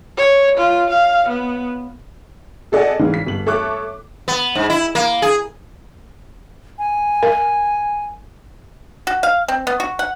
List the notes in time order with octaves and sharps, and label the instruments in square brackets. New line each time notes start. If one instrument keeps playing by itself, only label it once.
[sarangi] C#5
F4
F5
B3
[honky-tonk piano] G#4 A4 D5 D#5 F#5 G#5
G#2 C#3 E3 G#3
B6
G1 F#7
A4 C#5 E5 D6 F#6
[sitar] B3
G#2
E4
A#3
G#4
[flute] G#5
[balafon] A#4
[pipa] F#4
F5
C4
B3
F#4
F#5